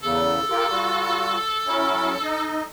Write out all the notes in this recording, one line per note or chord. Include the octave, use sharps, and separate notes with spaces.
E2 C#3 A4
F4 G4 A#4
G3 F4 F#4
F#3 C#4 E4
D#4 D#5